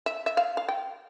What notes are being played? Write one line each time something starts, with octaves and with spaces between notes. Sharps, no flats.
E5
E5
F5
F5
G5